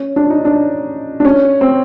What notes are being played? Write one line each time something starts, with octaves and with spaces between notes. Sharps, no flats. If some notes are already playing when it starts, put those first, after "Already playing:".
Already playing: C#4
D4
D#4
D4
D4
C#4
C4